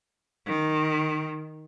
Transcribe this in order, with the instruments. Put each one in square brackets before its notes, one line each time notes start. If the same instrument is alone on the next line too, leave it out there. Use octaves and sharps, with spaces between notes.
[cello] D#3